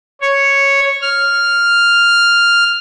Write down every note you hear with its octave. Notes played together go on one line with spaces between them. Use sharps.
C#5
F6